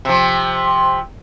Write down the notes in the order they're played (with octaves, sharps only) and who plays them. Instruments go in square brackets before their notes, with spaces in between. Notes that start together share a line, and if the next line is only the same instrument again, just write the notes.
[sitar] C3 F3